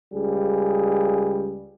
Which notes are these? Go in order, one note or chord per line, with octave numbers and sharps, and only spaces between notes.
C#2 G3 G#4